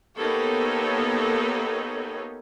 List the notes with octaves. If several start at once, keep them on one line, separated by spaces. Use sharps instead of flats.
A#3 B3 D#4 G4 A4 C#5